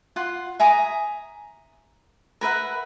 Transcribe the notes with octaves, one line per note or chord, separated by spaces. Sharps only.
F4 F#5 C6
E5 G#5 A#5 D#6
A#4 B4 E5 F#5